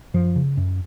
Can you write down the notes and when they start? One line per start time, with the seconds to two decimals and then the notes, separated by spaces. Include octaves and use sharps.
0.14 F#2 F3
0.36 C#3
0.57 F#2